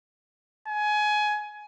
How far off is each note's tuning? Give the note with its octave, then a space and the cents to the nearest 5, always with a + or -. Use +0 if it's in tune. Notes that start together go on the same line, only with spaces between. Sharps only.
G#5 +20